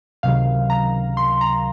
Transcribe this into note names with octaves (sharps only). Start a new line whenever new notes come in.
C#2 C3 D#3 F#3 F5
A#5
C6
A#5